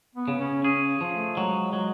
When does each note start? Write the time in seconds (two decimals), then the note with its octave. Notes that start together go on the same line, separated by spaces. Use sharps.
0.15 B3
0.28 C#3
0.39 C#4
0.64 C#4 G#4
1.01 F3
1.12 A3
1.36 F#3 G#3
1.73 F#3